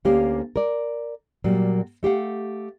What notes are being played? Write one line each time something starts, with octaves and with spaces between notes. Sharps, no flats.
D2 D3 A#3 C#4 G4 F5
A#4 D5
A#2 F#3 G3 A#3
A3 G4 F5 F#5